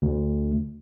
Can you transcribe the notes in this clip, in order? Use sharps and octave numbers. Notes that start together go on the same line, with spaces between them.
D2